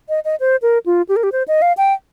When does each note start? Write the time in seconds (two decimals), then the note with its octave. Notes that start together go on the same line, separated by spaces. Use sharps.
0.09 D#5
0.25 D#5
0.40 C5
0.62 A#4
0.86 F4
1.09 G4
1.16 A#4
1.23 G4
1.32 C5
1.48 D#5
1.62 F5
1.77 G5